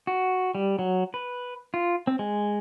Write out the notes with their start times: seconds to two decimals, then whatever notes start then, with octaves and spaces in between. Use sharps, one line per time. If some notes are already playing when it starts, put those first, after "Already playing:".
0.07 F#4
0.55 G3
0.79 F#3
1.14 B4
1.74 F4
2.07 C4
2.19 G#3